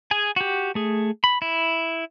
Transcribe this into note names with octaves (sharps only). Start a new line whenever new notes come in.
G#4 G#5
F#4 G4
A3 G#4
B5
E4